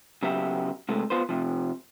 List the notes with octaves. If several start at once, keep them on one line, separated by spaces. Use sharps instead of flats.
C#3 F#3 B3 G4 E5
C3 G#3 A3
B3 F4 B4 C5
C3 F3